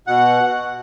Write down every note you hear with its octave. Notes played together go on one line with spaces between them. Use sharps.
B2 F#5